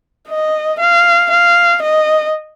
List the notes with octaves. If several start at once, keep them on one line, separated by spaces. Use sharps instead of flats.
D#5
F5
F5
D#5